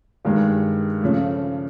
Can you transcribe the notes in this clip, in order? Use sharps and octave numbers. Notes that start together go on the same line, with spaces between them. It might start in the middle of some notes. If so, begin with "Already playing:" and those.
G2 D#3 G#3
C#3 F3 A3